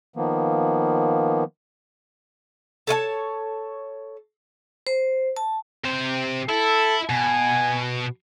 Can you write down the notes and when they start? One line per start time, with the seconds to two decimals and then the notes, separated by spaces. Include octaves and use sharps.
0.16 D#3 F3 A#3 B3
2.87 A4 C#5 D#5 A5
4.87 C5
5.37 A5
5.85 C3 C5
6.49 E4 A4
7.10 B2 G#5